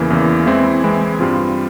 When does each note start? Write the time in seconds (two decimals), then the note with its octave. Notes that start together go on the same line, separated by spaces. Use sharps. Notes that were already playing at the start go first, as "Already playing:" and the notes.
Already playing: E2 C#3 E3 A#3
0.10 E2 C#3 E3 A#3
0.46 E3 G#3 C4 E4
0.84 E3 G#3 C4 E4
1.20 G2 G3 C4 F4